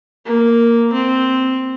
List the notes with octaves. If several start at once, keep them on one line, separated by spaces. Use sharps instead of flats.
A#3
C4